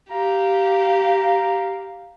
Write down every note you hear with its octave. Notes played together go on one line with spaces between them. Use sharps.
G4 F5 A#5